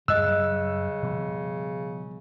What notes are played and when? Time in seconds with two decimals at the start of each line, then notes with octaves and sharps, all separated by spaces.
0.08 F#2 C#3 G3 D#5 E6 F#6
1.03 B2 F3 G3